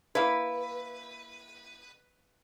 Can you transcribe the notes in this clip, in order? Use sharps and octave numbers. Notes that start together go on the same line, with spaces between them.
A#3 E4 B4